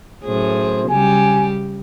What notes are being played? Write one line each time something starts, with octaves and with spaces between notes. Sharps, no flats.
F#2 A2 G#4 C5
C#3 G3 G4 G#5